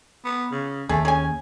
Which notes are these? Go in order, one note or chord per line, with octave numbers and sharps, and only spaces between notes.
B3
C#3
D#2 A3 G#4
C#4 G#4 G#5